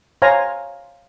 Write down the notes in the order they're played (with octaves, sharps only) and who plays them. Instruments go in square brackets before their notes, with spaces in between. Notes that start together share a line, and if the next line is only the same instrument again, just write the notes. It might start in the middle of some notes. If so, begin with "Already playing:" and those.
[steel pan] C5 C#5 F5 G#5 A#5